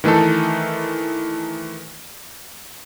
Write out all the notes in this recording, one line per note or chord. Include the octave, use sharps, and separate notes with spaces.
D#3 E3 A3 D#4 A4